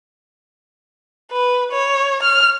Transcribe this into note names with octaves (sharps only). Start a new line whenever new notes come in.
B4
C#5
F6